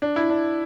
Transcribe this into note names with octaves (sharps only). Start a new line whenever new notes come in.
D4
E4
D4